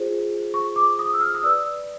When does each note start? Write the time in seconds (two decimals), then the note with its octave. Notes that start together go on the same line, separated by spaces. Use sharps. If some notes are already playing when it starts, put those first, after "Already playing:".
Already playing: F4 G#4 C5
0.54 C#6
0.76 D6
0.99 D#6
1.13 E6
1.21 F6
1.35 D#6
1.43 B4 D5 E6